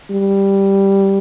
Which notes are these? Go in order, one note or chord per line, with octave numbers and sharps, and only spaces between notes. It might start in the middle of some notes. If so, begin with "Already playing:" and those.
G3